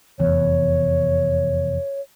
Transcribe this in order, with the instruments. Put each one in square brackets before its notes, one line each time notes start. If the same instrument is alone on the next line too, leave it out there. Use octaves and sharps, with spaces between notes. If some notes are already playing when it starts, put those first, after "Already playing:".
[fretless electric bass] F1 E2 [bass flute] C#5